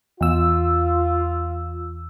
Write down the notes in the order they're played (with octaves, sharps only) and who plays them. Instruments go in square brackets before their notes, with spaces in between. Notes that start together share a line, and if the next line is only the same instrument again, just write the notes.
[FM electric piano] E2 E6 [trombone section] F4